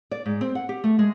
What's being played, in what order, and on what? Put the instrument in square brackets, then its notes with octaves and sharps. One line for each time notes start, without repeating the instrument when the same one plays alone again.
[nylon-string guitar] D5
G#2
C4
F#5
G4
A3
G#3